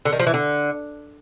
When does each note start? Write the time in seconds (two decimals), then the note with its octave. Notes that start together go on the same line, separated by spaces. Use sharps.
0.05 D3
0.12 D#3
0.20 F3
0.27 E3
0.34 D3